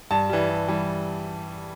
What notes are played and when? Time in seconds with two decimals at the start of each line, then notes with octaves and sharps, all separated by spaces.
0.11 G2 A5
0.29 E3 G3
0.50 G2
0.68 E3 G3